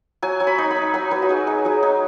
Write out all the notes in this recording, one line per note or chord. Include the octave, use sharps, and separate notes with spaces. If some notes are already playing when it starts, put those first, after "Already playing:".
F#3 G#5
F#3
B5
D#4
B5
D#4
F#3 G#5
F#3 B4
F#4
D#4 G#4
D#4 G#4
F#3 G#4
D#4